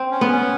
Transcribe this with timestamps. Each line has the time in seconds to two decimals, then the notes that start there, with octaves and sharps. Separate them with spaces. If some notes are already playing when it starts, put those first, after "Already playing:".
Already playing: C4
0.11 C#4
0.21 B3
0.31 C#4